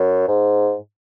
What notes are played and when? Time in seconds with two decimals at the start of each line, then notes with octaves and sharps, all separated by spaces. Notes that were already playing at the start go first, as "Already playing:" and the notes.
Already playing: F#2
0.28 G#2